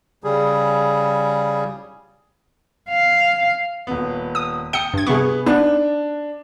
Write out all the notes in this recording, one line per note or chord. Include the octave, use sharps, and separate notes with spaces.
C#3 G3 G#4
F5
D#1 B3
D#6
G5 D#6 C#7 G7
G2 G#6
C3 B3 G#4 C#6
B3 D4 D#4 B4